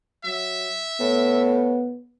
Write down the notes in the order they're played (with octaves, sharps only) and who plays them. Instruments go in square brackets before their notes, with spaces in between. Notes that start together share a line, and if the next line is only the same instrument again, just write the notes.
[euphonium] F#3 [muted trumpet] E5
[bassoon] A2 [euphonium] B3